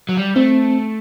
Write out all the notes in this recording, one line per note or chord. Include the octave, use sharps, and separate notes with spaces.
F#3
G3
A3 C4